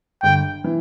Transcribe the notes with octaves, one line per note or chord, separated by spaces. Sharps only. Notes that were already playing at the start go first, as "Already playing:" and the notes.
G1 G5
E3